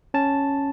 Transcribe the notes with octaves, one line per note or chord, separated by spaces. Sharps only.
C#4 A5